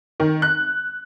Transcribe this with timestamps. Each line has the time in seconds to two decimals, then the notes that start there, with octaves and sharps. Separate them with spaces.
0.20 D#3
0.42 F#6